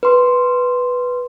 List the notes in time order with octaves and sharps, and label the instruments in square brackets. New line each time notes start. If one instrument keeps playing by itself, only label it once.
[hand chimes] B4 C6